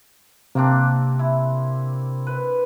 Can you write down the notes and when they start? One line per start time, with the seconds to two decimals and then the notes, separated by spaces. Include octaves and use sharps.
0.55 C3 A#3 C4 D4
1.19 E4
2.27 B4